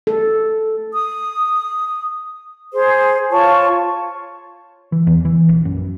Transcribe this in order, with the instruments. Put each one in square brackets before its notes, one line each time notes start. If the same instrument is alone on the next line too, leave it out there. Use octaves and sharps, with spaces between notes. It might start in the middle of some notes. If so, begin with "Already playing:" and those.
[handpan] A4
[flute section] D#6
G#4 C5
F4 C#5 A5 C#6
[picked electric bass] E3
E2
E3
A#1
F#2